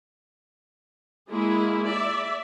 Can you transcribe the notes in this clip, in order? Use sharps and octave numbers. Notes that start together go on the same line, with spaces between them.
G#3 A#3 E4 G#4
D5 E5